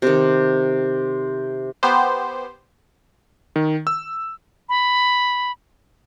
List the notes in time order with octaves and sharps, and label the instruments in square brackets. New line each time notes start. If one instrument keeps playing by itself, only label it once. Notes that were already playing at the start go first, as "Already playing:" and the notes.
[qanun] C3 D#3
[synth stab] B3 G4 C5
[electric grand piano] D#3
E6
[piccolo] B5